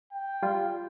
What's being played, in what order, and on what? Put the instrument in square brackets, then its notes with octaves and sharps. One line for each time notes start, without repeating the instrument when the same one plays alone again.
[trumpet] G5
[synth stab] G3 F4